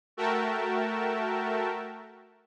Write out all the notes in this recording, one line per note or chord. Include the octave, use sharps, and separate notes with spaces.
A3 F#4 A#4 E5 G5 A5